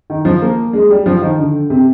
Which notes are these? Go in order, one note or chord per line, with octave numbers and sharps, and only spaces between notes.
D#3
F3
A#3
G#3
G3
F3
D#3
D3
C3